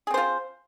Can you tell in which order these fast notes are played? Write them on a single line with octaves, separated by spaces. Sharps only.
G#4 C4 C5 F4